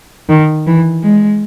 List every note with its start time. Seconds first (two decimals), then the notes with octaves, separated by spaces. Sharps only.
0.29 D#3
0.67 E3
1.04 G#3